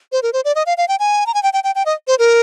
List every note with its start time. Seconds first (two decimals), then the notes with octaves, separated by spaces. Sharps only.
0.12 C5
0.23 A#4
0.33 C5
0.45 D5
0.55 D#5
0.66 F5
0.78 F5
0.88 G5
0.99 G#5
1.26 A#5
1.34 G#5
1.43 G5
1.53 G5
1.64 G5
1.75 G5
1.86 D#5
2.07 C5
2.19 A#4